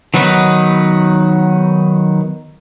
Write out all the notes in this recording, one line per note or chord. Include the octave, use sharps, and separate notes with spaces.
D#3 F#3 B3 D#4 B4